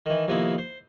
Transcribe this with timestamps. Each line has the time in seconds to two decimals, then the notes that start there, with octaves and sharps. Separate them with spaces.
0.06 D#3 E3
0.28 F2 C3 D#3 A#3 B3 E4
0.58 C5